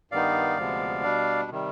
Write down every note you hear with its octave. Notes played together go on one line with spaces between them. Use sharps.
G2 D#3 B3 D#4 D5 F5
D2 C3 F3 G#3 B3
B2 G3 D4
C3 D#3 G3